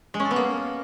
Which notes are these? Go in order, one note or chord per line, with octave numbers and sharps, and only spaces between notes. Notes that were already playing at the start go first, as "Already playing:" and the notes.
G#3
C#4
A4
B3
A#3